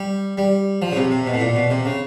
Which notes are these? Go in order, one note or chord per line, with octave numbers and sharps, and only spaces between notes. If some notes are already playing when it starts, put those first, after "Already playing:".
Already playing: G3
G3
F3
C#3
C3
C3
B2
A2
A#2
B2
C3
C#3